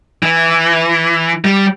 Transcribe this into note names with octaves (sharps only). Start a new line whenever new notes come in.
E3
G3